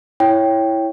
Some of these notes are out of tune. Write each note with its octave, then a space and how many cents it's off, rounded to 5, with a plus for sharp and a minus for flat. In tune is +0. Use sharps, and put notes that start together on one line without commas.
E4 +0 C#5 +0 G5 +0